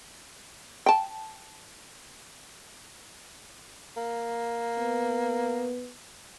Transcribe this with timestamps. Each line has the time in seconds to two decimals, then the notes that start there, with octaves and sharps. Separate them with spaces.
0.86 G5 A5
3.97 A#3
4.78 B3